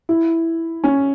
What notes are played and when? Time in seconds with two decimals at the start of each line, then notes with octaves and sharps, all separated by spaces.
0.09 E4
0.84 C#4